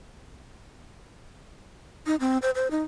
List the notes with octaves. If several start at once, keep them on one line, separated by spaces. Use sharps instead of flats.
D#4
C4
C5
C5
D#4